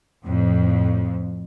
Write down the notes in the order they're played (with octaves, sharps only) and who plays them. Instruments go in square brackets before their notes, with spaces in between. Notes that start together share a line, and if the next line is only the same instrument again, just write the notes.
[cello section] F2 [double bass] A2